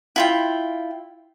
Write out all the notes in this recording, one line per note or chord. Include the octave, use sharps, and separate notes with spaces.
E4 F4 G5